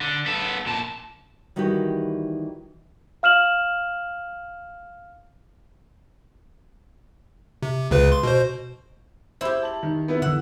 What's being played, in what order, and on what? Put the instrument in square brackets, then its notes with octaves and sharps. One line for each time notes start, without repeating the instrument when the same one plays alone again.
[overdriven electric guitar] D3
B3 A4
A#2 A5
[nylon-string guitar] D#3 E3 G3 D#4 F#4 G4
[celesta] F5 F6 E7 F#7
[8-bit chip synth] C3
C#2 C#3 B4
C6
B2 C5
[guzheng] E4 G4 [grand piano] C5
[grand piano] A5 F#7
[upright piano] D#3
[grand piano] B3 E4 B4
[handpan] D3 E3 [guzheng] F#5 [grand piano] E6